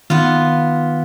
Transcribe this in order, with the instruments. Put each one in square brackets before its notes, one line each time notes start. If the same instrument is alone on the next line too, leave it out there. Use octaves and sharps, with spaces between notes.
[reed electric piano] D#3 [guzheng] B3 F4